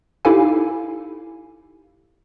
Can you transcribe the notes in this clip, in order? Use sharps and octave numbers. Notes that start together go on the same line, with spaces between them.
D#4 E4 G4 A4 F5 G#5